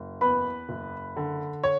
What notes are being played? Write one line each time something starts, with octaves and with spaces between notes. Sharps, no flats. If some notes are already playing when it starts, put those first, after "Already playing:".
Already playing: F#1
E2 B4 B5
F#1
D3
C#5